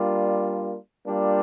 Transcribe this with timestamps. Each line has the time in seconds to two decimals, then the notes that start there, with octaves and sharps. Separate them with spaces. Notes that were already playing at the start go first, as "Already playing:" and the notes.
Already playing: G3 A#3 D4 F4
1.06 G3 A#3 D4 F4